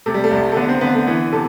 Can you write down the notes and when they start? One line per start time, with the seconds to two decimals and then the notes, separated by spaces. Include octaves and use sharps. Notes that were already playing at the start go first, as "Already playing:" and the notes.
0.06 C3 A3
0.14 G3
0.24 A3
0.31 C2
0.52 A3
0.56 D3 B3
0.69 C4
0.81 D3 B3
0.95 A3
1.07 E3 B3
1.32 C3 A4